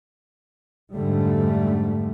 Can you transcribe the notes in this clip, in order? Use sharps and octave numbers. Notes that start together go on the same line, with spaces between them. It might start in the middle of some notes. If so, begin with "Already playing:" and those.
F2 G#2 D3 G3 A3